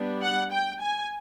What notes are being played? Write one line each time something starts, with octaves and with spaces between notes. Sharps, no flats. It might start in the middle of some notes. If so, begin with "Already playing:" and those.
Already playing: G3 B3 D4
F#5
G5
G#5